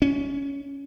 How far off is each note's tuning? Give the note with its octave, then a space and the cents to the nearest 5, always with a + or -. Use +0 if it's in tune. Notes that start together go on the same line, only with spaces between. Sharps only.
C#4 +15